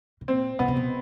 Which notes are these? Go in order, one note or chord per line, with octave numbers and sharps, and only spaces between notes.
B2
A#2 C4
B2 B3
C3
B2